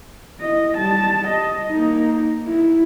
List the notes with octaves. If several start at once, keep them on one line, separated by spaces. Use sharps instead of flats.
E4 D#5
G3 A5
D#5
A#3 D#4
E4